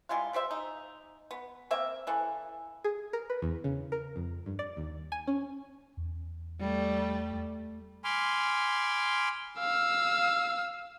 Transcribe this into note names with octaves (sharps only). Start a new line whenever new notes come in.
G3 G#3 E4 F4
G3 G4 C5 E5
D#4
B3
A#3 C4 E5
C#3 E3 A4
G#4
A#4
B4
E2
C#3
A#4
F2
G2
D5
D#2
G#5
C#4
E2
G3 A3
G#5 B5 C6 D6 F6
F5 E6